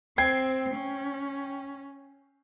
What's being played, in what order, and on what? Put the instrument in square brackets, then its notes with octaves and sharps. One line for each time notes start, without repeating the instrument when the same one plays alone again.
[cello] C4 [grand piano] G5 G#6 C7
[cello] C#4